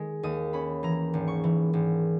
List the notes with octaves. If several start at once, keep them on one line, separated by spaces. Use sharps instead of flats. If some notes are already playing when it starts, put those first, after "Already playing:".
Already playing: D#3 G#3
D#2 D#6
C#4 B5
E3 A#5
G#1
C#6
E3
G#1